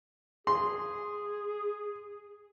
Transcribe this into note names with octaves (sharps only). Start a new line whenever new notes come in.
G#4 C6